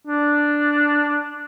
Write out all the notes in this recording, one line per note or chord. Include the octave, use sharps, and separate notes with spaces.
D4